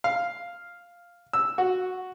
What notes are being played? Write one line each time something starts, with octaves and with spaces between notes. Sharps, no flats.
F5
E6
F#4